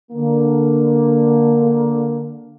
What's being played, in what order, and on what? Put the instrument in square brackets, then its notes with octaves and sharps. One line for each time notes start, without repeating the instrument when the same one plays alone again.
[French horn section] D3 A#3